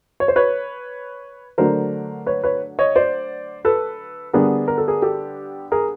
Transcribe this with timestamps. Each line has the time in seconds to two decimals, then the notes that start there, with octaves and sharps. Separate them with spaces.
0.20 C#5
0.28 C5
0.36 B4 C#5
1.58 D3 F#3 A3 D4 A#4 C5
2.26 B4 C#5
2.43 B4 C#5
2.79 C#5 D#5
2.96 C5 D5
3.65 A4 B4
4.33 D3 G3 B3 D4 G#4 A#4
4.68 A#4
4.78 A4
4.88 G#4 A#4
5.02 G4 A4
5.72 G#4 A#4